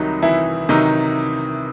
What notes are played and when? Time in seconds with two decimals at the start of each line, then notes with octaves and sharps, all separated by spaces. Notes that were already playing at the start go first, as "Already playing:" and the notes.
Already playing: C2 C3 D#3 F#3 D#4
0.22 E3 E4
0.69 C3 D#3 F#3 D#4